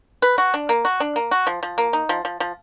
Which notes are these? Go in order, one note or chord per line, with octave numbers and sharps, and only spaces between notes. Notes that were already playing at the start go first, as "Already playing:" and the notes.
B4
F#4
D4
A#3
F#4
D4
A#3
F#4
F3
F3
A#3
D#4
F3
F3
F3